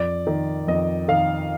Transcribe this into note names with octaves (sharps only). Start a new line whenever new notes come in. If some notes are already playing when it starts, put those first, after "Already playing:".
Already playing: F2 D5
D#3
F2 D#5
D#3 F5